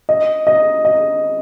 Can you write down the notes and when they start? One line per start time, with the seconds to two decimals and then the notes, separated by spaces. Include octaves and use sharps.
0.09 D#5
0.47 D#5
0.85 D#5